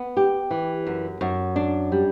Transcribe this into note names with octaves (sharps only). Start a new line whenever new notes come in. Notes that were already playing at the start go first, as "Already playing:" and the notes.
Already playing: B3
G4
E3
F#2
F#2
D4
G3